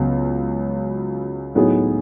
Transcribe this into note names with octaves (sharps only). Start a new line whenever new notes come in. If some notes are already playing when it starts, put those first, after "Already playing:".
Already playing: C#2 C#3 F#3 B3
A2 F#3 B3 D#4 G#4